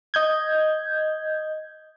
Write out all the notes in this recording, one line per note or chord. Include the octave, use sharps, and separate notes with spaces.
D#5 G6 G#6